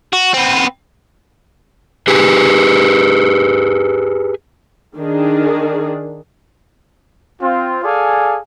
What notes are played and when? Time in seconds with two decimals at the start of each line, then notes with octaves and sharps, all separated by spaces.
0.13 F#4
0.34 B3 C4
2.08 G4 G#4 B4
4.96 D#3 D4 G#4
7.41 C4 F4
7.84 G#4 A4 D5 F5 G#5